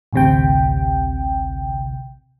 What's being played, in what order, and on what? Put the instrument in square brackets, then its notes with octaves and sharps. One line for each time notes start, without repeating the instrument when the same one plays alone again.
[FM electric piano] A1 D2 C3 G5